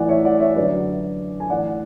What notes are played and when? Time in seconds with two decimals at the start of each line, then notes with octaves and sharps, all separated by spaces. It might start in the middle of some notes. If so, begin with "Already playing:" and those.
Already playing: A2 E3 D5 F#5 G#5
0.09 C#5 E5
0.25 D5 F#5
0.40 C#5 E5
0.56 F#2 D3 B4 D5
1.40 G#5
1.50 A2 E3 D5 F#5